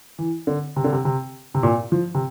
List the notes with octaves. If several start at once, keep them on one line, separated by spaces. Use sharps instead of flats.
E3
D3
C3
D3
C3
C3
C3
A#2
F3
C3